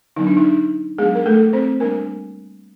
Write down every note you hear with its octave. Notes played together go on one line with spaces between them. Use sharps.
D3 F#3 B3 D4 D#4
D4
D#4
F#3 G#3 B3 D4 G#4
A#4
A3 A4
C4 C5
G3 A#3 D4 A#4